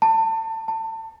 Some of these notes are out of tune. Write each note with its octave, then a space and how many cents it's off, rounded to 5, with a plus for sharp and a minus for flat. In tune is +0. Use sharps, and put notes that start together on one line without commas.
A5 +30
A5 +30